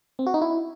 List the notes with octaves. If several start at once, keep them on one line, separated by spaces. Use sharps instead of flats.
C4
F#4
D#4
E4